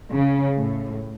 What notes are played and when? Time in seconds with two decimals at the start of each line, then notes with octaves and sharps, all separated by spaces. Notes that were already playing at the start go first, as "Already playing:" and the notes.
0.12 C#3
0.58 A2